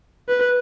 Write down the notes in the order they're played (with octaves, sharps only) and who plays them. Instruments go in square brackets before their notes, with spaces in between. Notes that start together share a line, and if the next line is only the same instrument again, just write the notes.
[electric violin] B4